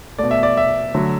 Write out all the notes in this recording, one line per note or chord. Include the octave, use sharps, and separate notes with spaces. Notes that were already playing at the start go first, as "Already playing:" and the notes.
B2 A3 D5
E5
D5
E5
D3 F#3 A3